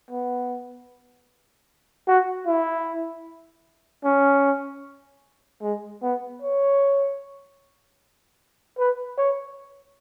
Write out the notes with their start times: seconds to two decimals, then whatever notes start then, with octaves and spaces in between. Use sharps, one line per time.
0.10 B3
2.07 F#4
2.46 E4
4.04 C#4
5.62 G#3
6.03 B3
6.42 C#5
8.79 B4
9.18 C#5